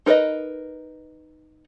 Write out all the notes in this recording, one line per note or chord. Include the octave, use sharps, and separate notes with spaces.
D#4 A#4 B4 C#5 D#5